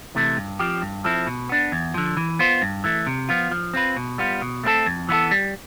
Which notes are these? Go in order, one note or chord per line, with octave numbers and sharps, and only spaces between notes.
C3 E3 A3
G2
F3 C4 G4
G2
F3 C4 E4 A4
B2
B3 D4
E2
D3 F3
E3
B3 F4 C5
G2
E3 A3
C3
F3 B3 F4
F3
C4 F4 B4
B2
G3 B3 F4
B2
A3 C4 E4 A4
F2
E3 B3 E4 A4
G3